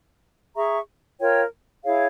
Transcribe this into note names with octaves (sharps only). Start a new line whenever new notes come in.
G#4 E5 A#5 C#6
F4 A#4 C#5 G5
E4 G#4 C#5 F5